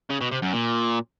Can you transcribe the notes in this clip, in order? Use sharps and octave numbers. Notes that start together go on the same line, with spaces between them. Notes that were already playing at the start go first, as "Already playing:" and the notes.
C#3
B2
C3
F#2
A#2